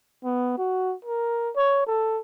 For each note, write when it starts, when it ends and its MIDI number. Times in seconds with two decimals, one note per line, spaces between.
0.24 0.54 59
0.58 0.95 66
1.05 1.50 70
1.56 1.83 73
1.87 2.20 69